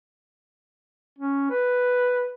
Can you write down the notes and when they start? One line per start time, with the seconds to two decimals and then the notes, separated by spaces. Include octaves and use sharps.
1.18 C#4
1.50 B4